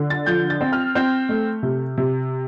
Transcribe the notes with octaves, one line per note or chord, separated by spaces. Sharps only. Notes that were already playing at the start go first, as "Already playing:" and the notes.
Already playing: D3
A6
F3 G6
A6
C4
F6
C4 G6
A3
C3
C3